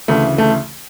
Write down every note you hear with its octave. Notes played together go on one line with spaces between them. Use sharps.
D2 C#3 E3 A3
A3